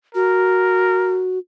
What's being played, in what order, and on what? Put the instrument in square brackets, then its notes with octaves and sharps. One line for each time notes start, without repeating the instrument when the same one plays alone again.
[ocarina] F#4 [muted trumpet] A#4